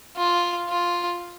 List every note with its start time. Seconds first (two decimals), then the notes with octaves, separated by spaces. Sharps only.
0.17 F4
0.69 F4